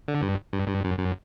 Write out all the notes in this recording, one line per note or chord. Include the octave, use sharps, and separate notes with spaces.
D3
G2
G2
G2
F#2
F#2